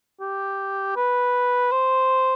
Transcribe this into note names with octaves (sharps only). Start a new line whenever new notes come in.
G4
B4
C5